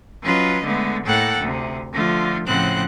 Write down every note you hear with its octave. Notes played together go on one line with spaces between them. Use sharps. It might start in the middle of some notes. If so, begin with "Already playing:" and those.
F#3 C#4 F4 B4 D#5
D3 G#3 A3 B3
A2 A#3 A4 F#5 G5 F#6
D2 C3
D3 F3 A3 F4
A2 C#3 F3 C4 F#5 F#6